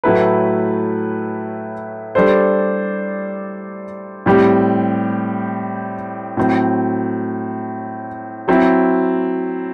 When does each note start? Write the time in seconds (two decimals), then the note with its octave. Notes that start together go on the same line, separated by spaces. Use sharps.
0.04 A2 F#3 A3 E4 B4
2.15 G3 D4 A4 C5
4.26 A2 G3 C4 G4
6.37 A2 F#3 C4
8.48 F#3 C4 E4